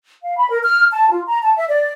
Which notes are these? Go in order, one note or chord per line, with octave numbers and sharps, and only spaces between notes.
F5
B5
A#4
F6
A5
F4
A#5
A5
E5
D5